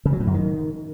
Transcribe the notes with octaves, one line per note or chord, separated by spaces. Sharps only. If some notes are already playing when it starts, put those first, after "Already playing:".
C#3
F#3
A2
F#2
D#3